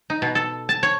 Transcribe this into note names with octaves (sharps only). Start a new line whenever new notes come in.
D#4
B2
A4
A5
C#5